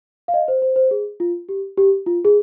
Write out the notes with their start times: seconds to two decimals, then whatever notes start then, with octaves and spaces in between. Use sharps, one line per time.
0.28 F5
0.34 D#5
0.48 C5
0.62 C5
0.76 C5
0.91 G#4
1.20 F4
1.49 G4
1.78 G4
2.06 F4
2.25 G#4